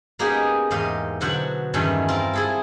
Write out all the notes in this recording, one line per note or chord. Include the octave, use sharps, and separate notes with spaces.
A#3 B3 C#4 D#4 G4 G#4
E2 G#2 G4 D#5 F5 C6
B2 D3 F#3 F#4 C5 F#5
E2 G2 D#3 F#3 A3 C#4
C4 F4 A#4
E4 G#4 A4